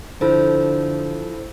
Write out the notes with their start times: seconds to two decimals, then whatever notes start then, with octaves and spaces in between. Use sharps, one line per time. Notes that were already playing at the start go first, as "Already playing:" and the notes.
0.21 D3 F3 E4 A4 C5